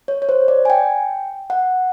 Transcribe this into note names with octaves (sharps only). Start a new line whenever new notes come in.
C#5
C#5
C5
D5
G#5
G5
F#5